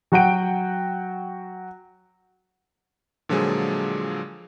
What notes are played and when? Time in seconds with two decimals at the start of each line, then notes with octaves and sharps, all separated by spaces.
0.12 F#3 F#4 F#5 G5 D7
3.29 A#2 D3 F3 F#3 G#3 G#4